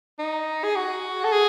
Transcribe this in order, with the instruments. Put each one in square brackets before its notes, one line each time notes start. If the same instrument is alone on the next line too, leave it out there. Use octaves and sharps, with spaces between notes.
[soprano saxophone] D#4
G#4
F#4
A4
G#4